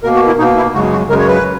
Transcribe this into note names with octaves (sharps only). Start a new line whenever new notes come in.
B2 A#3 A#4
F#4
E4
B2 A#3 D#4
E4
F#2 C#3 G#3 F#4
F#4
F#2 C#3 G#3 A#4
C#5
B4